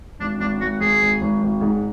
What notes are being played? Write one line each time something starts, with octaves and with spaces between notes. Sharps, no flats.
G#1 D4
G#1 D4
G#1 F#4
G#1 G#4
G#1
G#1
G#1
G#2